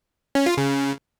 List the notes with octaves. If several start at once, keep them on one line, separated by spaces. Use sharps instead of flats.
C#4
F4
C#3